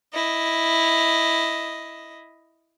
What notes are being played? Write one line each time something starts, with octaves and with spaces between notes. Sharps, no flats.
E4 D#5